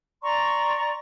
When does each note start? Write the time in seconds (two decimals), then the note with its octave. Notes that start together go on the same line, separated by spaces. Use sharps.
0.23 D5 A#5 C6 C#6